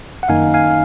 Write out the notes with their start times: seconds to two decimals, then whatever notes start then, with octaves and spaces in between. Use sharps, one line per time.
0.23 F#5
0.29 F#2 D#3 A#3 D#4 F5 G#5
0.54 F5 G#5